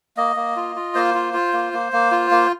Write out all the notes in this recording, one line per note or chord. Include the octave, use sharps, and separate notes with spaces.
A#3 D#5
A#3
F4
F4
A#3 C5
F4
F4
A#3
A#3
A#3
F4
A#3